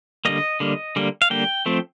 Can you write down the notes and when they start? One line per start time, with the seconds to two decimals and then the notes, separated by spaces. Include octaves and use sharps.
0.25 D3 G3 A#3 D#5
0.60 D3 G3 A#3
0.96 D3 G3 A#3
1.22 F5
1.30 D3 G3 A#3 G5
1.66 F3 A3 C4